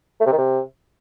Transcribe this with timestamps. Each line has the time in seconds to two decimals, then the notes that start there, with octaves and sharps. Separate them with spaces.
0.20 A3
0.26 C3
0.32 D#3
0.38 C3